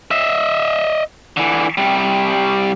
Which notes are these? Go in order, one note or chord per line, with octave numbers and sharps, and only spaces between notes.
D#5 E5
D3 E3
C3 G3